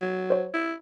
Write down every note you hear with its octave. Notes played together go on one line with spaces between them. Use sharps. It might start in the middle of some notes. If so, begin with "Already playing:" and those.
F#3
C5 C#5
E4